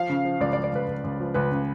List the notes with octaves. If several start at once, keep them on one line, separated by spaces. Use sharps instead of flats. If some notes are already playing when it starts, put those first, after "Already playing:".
Already playing: F3 F5
C#3
F3
C#2 D5
D5
F3
D5
C#2 B4
C#2
C#2
F3
C#2 B4
C#3